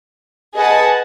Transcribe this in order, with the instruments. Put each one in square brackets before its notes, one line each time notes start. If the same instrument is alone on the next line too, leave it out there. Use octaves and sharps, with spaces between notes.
[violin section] G#4 B4 D#5 F#5 A5